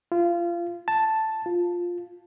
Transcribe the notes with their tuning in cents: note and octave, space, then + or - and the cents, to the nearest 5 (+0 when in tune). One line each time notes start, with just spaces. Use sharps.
F4 -25
A5 +0
F4 +5